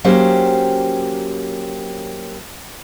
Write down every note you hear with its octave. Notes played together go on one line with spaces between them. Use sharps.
F#3 A#3 C#4 G4 C5